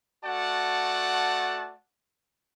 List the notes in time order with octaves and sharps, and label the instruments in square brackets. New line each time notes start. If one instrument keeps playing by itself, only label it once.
[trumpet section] A3 F#4 D5 F#5 A5